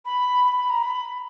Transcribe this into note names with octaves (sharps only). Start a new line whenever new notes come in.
B5
B5
B5
A#5
B5